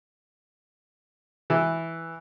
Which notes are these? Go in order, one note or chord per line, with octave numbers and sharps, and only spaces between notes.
E3